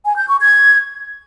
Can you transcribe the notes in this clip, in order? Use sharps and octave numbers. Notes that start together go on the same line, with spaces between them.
G#5
G6
C#6
G#6